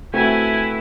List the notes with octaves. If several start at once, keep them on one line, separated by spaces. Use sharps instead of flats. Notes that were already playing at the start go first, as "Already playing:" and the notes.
A3 C4 E4 F#4 B4 G#5